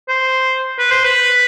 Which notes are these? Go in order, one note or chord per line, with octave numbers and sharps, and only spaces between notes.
C5
B4
C5
B4